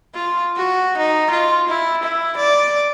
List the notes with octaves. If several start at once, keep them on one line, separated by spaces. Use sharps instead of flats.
F4
F#4
D#4
F4
E4
E4
D5